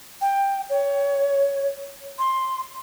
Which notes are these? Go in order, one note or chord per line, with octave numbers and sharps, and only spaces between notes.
G5
C#5
C6